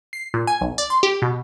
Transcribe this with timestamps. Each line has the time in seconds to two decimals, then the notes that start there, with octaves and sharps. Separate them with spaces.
0.13 C7
0.34 A#2
0.47 G#5
0.61 B1
0.78 D5
0.90 C6
1.03 G4
1.22 B2